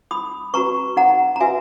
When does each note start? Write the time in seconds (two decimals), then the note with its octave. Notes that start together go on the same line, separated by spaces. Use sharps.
0.11 D#4 B5 D#6
0.54 F#4 B4 A#5 C#6
0.97 D#4 F#5 A#5
1.36 A#5
1.40 F#4 B4 E5 G#5